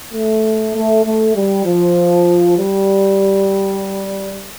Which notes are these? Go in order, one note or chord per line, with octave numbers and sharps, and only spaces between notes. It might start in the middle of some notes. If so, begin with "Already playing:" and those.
A3
A3
A3
G3
F3
G3